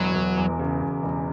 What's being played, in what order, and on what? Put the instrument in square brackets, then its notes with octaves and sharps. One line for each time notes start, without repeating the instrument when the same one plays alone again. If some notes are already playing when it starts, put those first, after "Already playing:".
Already playing: [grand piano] E1 [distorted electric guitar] F#3
[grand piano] E1
E2
C#3
E1
E1